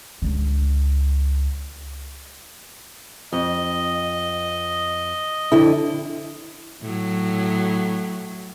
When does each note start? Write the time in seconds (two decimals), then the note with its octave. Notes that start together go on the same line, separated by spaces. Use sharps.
0.22 C#2 D3
3.32 F2 D#5
5.52 F2 D3 E4
6.82 A2 F#3